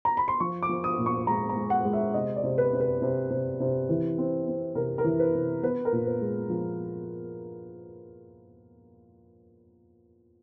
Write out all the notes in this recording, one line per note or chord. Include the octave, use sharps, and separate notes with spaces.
A#5
B5
C6
F3 C#6
D6
F3
D#6
A#2
C#6
G#3 A#5
A#5
G#3
F#5
G#3
E5
C3 D#5
D5
C3
B4
C3
B4
C3
C3
C3
E3
C4
C4
C3 A#4
A#4
E3
B4
C3
B3 B4
A#4
A#2
B4
G#3
F3